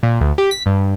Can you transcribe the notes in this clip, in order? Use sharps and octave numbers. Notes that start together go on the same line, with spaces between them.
A#2
D2
G4
B6
G2